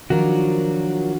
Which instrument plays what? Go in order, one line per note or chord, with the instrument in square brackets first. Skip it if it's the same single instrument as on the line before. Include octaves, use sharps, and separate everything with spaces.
[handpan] D#3 F3 [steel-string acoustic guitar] F#3 F4 A#4 [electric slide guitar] D4 F#4